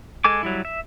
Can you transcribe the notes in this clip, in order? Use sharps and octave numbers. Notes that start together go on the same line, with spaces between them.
G#3 A4 G#5 D6
F#3 G3 E4
E5